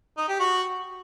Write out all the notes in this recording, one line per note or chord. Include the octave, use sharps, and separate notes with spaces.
D#4
G4
F#4